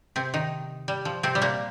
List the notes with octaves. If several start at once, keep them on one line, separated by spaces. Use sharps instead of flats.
C3 C4
D#3 D#4
G3
F3
C3 C4
G3
A#2 A#3